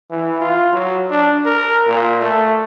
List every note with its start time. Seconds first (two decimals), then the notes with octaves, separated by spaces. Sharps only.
0.11 E3
0.41 F4
0.72 F#3
1.10 D4
1.45 A#4
1.88 A#2
2.21 A3